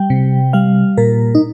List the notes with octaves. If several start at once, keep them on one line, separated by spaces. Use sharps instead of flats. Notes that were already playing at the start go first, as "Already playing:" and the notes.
Already playing: G3 G5
C3
G3 F5
A#2 A#4
D#4